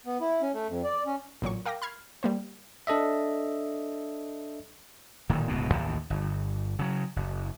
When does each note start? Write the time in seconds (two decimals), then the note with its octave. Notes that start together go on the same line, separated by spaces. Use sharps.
0.06 B3
0.21 E4
0.42 C#4
0.54 A3
0.68 F2
0.84 D5
1.06 C#4
1.42 A1 A#2 F#3 C#6
1.66 A#4 F5 G5 D6 A#6
1.82 B5 F6 G#6 C7
2.23 G3 A#3 C5
2.87 D4 A4 D#5 E5
5.30 D1 A#2 D#3
5.48 D1 C#2 B2 B3
5.70 A1 D#2 A2
6.10 G1
6.79 C#3 F#3
7.16 F#1